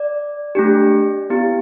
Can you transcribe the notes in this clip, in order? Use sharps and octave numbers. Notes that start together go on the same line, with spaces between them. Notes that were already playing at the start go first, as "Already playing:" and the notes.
Already playing: D5
A3 D4 G4
B3 E4 G4